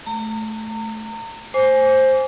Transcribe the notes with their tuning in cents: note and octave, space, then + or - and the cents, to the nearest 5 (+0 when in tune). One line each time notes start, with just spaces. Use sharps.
A3 -15 A#5 -35
C5 +10 G#5 +0 D6 -30